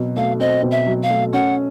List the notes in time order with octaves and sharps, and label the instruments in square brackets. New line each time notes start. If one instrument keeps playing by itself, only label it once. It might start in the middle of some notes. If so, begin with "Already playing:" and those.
Already playing: [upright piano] B2 F#3 C4
[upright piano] A3 [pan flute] F5
[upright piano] C4 [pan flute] D#5
[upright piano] B2
[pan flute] E5
[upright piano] F#3
[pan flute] F5
[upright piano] A3
[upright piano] C#4 [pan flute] F#5